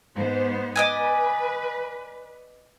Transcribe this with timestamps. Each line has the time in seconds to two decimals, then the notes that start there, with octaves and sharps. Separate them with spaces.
0.16 G#2 B3 C5
0.76 B4 D5 D#5 G#5